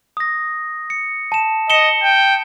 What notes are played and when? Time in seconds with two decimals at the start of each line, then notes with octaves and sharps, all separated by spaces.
0.17 D#6 A#6
0.90 C#7
1.32 A5 E7
1.70 D#5 C#7 E7 G7
2.02 G5